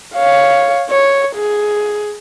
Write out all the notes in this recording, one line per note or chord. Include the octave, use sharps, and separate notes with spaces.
C#5 F5
C#5
G#4